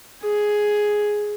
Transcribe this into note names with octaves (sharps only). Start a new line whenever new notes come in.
G#4